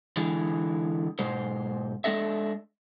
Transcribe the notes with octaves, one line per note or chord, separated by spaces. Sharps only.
D3 E3 G#3
G#2 B2 G#3 C5
G#3 C4 D4 A4 D#5 E5